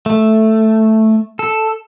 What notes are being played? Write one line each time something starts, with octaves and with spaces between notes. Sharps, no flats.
A3
A4